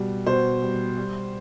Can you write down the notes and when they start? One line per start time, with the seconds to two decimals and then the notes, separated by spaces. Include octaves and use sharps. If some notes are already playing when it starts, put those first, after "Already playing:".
Already playing: B2 G3
0.26 B2 C5
0.62 G3
0.97 G3